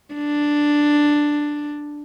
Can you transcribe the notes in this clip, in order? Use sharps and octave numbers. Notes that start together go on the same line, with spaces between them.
D4